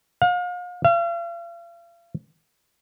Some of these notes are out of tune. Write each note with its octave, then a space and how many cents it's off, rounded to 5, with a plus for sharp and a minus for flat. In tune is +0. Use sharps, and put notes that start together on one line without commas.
F5 +40
F5 -40